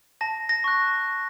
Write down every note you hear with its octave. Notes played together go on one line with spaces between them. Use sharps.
A5 A#6
A#6
C#6 F#6